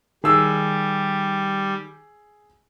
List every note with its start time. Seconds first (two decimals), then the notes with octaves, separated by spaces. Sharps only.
0.24 D#3 G3 G#4 E6